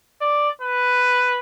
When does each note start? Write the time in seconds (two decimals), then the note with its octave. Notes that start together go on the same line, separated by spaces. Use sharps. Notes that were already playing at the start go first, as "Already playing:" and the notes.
0.21 D5
0.61 B4